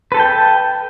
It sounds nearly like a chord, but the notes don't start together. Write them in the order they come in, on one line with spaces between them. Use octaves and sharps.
B4 A4 A5 G5